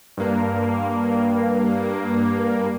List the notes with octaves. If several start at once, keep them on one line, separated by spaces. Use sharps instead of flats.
G2 A#3